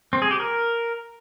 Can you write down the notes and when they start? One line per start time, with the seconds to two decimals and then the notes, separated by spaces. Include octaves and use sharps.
0.13 C4
0.22 G#4
0.31 G4
0.40 A#4